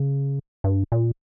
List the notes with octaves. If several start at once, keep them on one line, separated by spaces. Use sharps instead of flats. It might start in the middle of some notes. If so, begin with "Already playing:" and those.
Already playing: C#3
G2
A#2